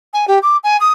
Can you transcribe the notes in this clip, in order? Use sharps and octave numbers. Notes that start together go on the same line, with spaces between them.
G#5
G4
D6
G#5
D#6